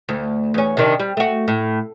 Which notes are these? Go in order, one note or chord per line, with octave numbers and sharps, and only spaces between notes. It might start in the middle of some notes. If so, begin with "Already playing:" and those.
D2
E2 C#4
C3 D#3 D4
G3
A3 F#4
A2